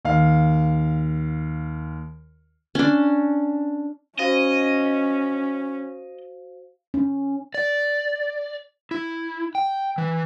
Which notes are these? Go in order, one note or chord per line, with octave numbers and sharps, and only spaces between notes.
D#2 F5
C#4 D4
C#4 F#4 C5 D#5 F5
C#4
D5
E4
G5
E3